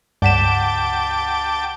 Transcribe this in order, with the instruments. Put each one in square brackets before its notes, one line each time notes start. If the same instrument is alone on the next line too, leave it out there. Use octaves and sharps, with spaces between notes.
[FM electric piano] C#2 F#5 B6 [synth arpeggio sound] G2 E7 [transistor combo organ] G5 A5 D6